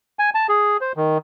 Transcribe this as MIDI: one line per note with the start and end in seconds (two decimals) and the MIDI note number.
0.19 0.30 80
0.35 0.47 81
0.49 0.77 68
0.81 0.92 72
0.97 1.18 51